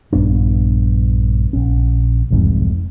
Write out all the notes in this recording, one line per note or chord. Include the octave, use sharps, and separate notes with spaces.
A#1 G2 B3 D4
A#1 C#4
E1 C2 F2 G#2